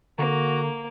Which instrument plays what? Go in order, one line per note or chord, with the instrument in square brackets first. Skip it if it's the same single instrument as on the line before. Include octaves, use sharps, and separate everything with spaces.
[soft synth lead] D3 [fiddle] A#3 [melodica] F#4 A#5